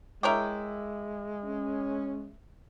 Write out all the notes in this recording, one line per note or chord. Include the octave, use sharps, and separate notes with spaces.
G#3 E4 A#4 C#5 G5 D6
C#4